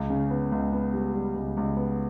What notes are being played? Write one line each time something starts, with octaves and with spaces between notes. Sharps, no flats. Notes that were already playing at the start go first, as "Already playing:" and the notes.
Already playing: C#2
C#3
B3
C#2
B3
G3
G3
C#2
C#2
B3